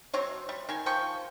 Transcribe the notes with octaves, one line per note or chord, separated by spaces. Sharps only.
F#3 C4 C5 C#5
G3
D#3 G#5
F3 G5 C#6